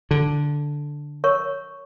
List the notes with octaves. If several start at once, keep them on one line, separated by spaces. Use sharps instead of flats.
D3
A#4 C#5 C#6